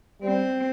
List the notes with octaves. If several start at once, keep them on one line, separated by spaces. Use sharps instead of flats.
G3 C4